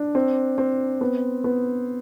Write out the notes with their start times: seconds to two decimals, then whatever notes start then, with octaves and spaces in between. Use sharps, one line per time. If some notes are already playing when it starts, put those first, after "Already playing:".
Already playing: D4
0.15 C4
0.58 C4
1.01 B3
1.44 B3